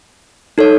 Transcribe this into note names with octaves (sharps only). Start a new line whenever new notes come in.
D#4 A4 C#5